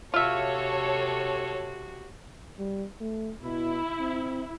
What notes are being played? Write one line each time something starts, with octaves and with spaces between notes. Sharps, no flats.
C3 F4 F#4 A4 C#5 E5
G3
A3
B2 E4
C4